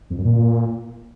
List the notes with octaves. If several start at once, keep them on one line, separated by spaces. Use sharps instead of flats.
F2
F#2
A#2